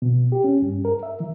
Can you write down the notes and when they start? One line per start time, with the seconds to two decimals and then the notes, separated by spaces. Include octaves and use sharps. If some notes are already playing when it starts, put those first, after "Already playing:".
0.02 B2
0.32 G4
0.44 C#4
0.62 G2
0.85 A#4
1.03 E5
1.20 E3